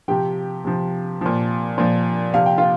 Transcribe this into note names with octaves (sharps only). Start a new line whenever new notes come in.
C3 F3 G4 G5
C3 F3
A#2 F3
A#2 F3
C3 F3 F5
G5
F4 F5